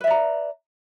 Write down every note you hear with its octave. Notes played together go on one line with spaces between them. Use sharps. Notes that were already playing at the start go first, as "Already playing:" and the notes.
B4 D5 E5 A#5